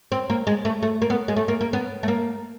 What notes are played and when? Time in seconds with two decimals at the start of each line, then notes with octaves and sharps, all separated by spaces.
0.12 C4
0.30 A#3
0.47 G#3
0.65 A3
0.83 A3
1.02 A#3
1.10 B3
1.28 G#3
1.36 A3
1.48 A#3
1.61 A#3
1.73 B3
2.03 A3
2.08 A#3